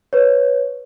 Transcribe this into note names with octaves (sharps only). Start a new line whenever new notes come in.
B4 C#5